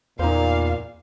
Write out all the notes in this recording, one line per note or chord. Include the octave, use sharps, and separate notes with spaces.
E2 A#2 D#4 C5 F5